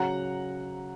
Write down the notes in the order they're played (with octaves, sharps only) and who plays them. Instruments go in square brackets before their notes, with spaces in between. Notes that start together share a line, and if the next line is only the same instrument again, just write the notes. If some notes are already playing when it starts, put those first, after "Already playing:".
Already playing: [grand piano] C#3 F#3 C#4 [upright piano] F#5 A#5